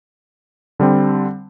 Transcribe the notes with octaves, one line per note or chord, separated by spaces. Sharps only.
D3 G3 C4